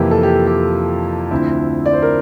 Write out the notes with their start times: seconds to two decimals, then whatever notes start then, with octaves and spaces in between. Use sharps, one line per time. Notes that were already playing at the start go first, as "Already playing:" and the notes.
Already playing: F2 C3 E3 A#3 E4 G4
0.11 A4
0.23 G4
0.47 G4
1.31 D2 D3 F3 C4 E4
1.86 D5
1.93 C5
2.02 A#4